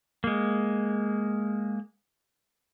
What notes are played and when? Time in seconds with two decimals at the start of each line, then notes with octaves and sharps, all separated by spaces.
0.24 G#3 A#3